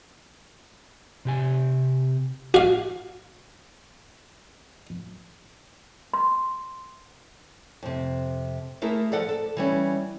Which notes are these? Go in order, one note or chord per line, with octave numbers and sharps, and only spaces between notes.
C3 G4 G#5
F#4 F5
C6
F2 C3
A3 A#3 E4 G#4 A#4
F3 A4 D5 F#5
A4
E3 G3 C#4